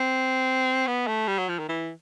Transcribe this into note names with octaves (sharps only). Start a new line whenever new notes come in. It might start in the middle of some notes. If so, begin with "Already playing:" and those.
Already playing: C4
B3
A3
G3
F#3
F3
D#3
E3